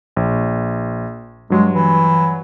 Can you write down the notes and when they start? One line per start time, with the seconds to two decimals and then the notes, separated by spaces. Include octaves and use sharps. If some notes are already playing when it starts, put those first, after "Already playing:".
0.16 A#1
1.50 G2 F#3 G#3
1.74 E3